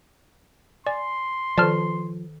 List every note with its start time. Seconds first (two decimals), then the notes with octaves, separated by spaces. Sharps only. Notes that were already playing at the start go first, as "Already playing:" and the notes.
0.87 D5 G#5 C6
1.57 D#3 F3 A4 C5 D5 A5 F6